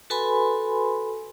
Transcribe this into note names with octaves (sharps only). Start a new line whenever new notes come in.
F#4 A4 B4 G#5 B5 C6